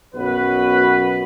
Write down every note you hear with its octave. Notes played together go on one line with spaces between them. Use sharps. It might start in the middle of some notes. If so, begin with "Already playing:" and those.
B1 F#2 B3 F#4 B4